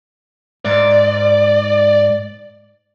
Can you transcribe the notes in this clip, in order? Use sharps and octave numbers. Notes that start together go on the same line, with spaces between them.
G#2 D5